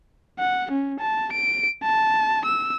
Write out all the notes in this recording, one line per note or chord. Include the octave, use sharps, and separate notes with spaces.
F#5
C#4
A5
D7
A5
E6